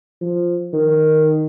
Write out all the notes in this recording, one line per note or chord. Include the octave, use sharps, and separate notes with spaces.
F3
D#3